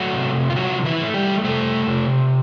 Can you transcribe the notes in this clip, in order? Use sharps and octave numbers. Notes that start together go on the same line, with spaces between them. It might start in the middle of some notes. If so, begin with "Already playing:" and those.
Already playing: F#3 A3 F#4
C3
F4
F3 F#3 F#4
E3 E4
A3
G3 G4
C3 A3 A4
C3